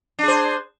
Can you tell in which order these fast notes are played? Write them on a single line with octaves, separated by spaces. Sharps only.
D4 G#4 C5